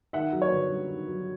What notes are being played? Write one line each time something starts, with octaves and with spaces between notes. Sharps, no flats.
D#3 E5 F#5
F#3
B4 C#5
G1
G2
D#3
F#3